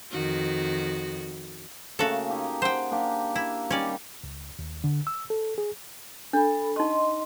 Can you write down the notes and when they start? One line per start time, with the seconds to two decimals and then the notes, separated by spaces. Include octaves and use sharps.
0.11 F2 D#3 F#4
1.99 C#3 A3 A#3 F#4 A4
2.29 D#4 G4 G#5
2.62 C5 F#5 G5
2.91 A#3 D4 G4
3.36 E4
3.70 D#3 G3 C#4 D5
4.24 C#2
4.59 D#2
4.84 D3
5.07 E6
5.30 A4
5.58 G#4
6.33 D4 A4 B5
6.76 D#4 D#5 C6 C#6